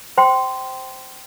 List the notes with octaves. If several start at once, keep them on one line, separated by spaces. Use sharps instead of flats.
C5 G5 C6